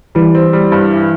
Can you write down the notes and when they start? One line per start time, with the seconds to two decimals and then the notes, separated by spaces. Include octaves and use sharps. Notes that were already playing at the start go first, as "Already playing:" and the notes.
0.15 E3 G3
0.35 C4
0.53 G3
0.72 G2
0.91 E3